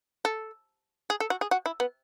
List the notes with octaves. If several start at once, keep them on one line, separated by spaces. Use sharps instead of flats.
A4
G#4
A4
F#4
G#4
F#4
E4
B3